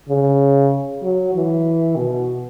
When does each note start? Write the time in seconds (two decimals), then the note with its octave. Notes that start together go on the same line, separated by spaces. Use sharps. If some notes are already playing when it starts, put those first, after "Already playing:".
0.09 C#3
1.03 F#3
1.34 E3
1.96 B2